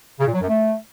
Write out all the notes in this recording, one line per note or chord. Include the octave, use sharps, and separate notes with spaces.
C#3
A#2
F#3
F#2
A3